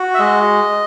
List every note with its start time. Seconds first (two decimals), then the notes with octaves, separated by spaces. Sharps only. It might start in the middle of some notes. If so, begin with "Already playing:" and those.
Already playing: F#4
0.14 E5
0.19 G#3 D#5